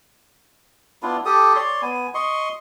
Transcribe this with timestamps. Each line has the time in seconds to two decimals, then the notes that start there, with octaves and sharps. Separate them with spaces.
1.03 B3 D4 E4 F4
1.25 G4 A4 D#6
1.56 C#5 D5 C6
1.82 B3 G#5
2.14 D#5 C6 C#6